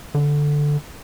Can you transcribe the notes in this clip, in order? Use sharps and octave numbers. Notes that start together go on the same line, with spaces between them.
D3